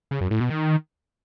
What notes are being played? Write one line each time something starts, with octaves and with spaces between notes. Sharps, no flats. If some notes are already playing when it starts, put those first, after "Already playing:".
C#3
F#2
A2
B2
D#3